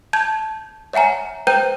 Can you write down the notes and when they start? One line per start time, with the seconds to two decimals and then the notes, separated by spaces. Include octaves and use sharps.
0.13 A5 G6 G#6
0.93 C#5 E5 F#5 G#5 A#5
1.47 B4 C5 G5 A#5 G6 D#7